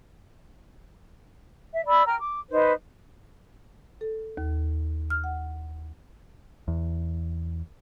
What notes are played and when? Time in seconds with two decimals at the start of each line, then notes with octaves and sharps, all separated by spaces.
1.74 E5
1.88 D5 B5 E6
2.06 A#4 G5 A#5 F6
2.20 D6
2.50 D#4 B4 C5
4.01 A4
4.37 D#2
5.10 F6
5.24 F#5
6.68 E2